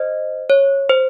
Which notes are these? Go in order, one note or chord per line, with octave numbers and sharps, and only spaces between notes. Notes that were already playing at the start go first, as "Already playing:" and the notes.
Already playing: C5 D#5
C#5
C5